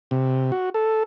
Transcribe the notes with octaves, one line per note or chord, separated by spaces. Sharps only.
C3
F#4
A4